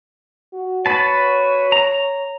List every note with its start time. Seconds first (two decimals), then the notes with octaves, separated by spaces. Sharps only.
0.53 F#4
0.86 F#4 B4 C#5 A5
1.72 A#5